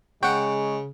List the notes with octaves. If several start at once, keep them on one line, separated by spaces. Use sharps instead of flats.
C#3 G#3 F#5 G5 C#6